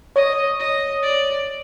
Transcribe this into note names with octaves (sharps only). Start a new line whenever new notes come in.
C#5 D#5
D#5
D5